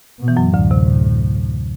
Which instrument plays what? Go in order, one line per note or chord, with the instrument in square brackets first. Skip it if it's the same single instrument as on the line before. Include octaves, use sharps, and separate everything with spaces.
[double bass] B2
[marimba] E3
F#2 F#3
[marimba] D2 D3 [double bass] A2
[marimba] C3